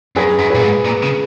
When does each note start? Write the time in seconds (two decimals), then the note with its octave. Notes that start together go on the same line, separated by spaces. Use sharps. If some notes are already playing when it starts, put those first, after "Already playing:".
0.16 F#2 G#4 B4
0.39 F#2
0.50 A#2 G#4 B4
0.62 G#2
0.85 A#2
1.02 C#3